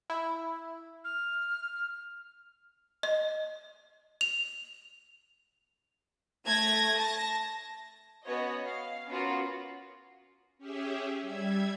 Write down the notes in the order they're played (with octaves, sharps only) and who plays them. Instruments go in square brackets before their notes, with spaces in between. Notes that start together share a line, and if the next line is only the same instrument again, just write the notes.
[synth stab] E4
[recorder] F6
[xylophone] D#5
F7
[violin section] A3 G#6 A#6
A5 A#6
B3 C#4 F#4 B4 C#5 D#5
F5
B3 C#4 F4 F#4 A#4
[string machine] C#4 G4 G#4 E5
G3 E5 G#6